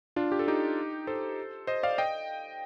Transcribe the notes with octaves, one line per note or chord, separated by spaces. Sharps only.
D4 F4
G4
A4
D#4 G4
A4 C5
C5 D#5
D5 F5
D#5 G5